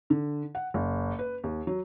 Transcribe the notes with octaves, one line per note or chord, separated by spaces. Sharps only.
D3
F#5
F#1
B4
D#2
F#3